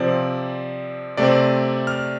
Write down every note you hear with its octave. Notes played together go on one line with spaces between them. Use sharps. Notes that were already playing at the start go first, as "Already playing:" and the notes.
Already playing: C3 F3 C4 D5
C3 A3 C4 D5
F6